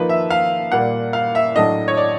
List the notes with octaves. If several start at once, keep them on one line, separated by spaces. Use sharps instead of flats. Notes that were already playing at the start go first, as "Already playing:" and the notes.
Already playing: F3 A#3 D#4 B4
E5
F5
A#2 G3 A#3 F#5
F5
E5
A2 F#3 A3 D4 D#5
C#5
D5